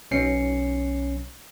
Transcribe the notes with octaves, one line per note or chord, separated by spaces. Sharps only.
B1 C#4 C7 C#7